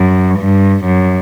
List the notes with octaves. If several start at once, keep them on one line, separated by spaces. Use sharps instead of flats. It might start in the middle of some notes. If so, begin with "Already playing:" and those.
Already playing: F#2
G2
F#2